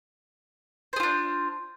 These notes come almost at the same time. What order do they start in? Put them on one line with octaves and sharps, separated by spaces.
C5 G#4 F4 D4